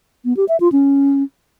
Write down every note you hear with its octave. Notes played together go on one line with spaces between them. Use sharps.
B3
G4
E5
F4
C#4